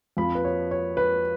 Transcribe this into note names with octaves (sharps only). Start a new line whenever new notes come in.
F2 F3 B5
B4
C#5
C#5
B4